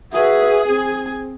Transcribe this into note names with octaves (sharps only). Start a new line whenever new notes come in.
F#4 G#4 B4 E5
C4 G#5